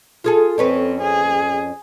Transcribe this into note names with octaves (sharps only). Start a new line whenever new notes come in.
F4 G#4 A4
F2 C4 C#4 B4
G#4